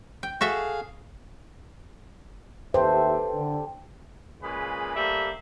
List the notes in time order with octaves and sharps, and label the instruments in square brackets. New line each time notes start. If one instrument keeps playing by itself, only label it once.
[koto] G5
[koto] F#4 A4 E5 [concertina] G#4 F5
[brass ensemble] D#2 E5 [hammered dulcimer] G4 A4 [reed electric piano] B4 [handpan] C5
[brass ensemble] D3
[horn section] A#2 C#3 G#3 G#4 B4 B5
G3 A3 A#3 C5 E5